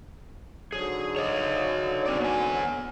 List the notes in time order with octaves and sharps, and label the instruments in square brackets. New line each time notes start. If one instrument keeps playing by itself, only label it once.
[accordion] G#2 D3 F#3 [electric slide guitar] G#4
[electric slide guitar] C#5 D#5
C4 D5
B3 G#5